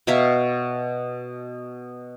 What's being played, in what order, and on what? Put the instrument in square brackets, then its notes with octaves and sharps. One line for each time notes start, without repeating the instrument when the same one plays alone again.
[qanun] B2 C#5 E5 F5